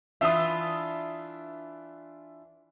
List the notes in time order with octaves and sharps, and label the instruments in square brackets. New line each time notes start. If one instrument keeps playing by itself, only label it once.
[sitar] E3 D4 F4 [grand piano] E5 D#6